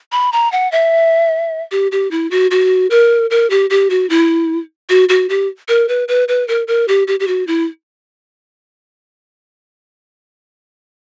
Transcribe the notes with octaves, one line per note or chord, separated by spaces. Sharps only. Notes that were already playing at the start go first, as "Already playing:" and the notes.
B5
A#5
F#5
E5
G4
G4
E4
F#4
F#4
A#4
A#4
G4
G4
F#4
E4
F#4
F#4
G4
A#4
B4
B4
B4
A#4
A#4
G4
G4
G4
F#4
E4